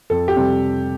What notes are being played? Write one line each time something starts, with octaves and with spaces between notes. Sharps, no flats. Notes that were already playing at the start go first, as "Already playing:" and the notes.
F2 A4
G4
C3 G3 C4